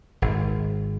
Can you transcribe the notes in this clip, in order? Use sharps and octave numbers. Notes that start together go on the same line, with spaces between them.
G#1